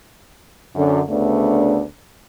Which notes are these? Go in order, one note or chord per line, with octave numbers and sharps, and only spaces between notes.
F#2 D3
D2 C#3 A3 B3 D4